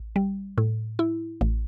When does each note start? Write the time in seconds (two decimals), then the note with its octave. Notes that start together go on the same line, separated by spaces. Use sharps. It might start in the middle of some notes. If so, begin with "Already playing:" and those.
Already playing: A1
0.16 G3
0.58 A2
0.99 E4
1.41 A1